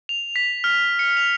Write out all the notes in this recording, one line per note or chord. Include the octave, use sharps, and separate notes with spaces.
F7
B6
F6
C#7
F7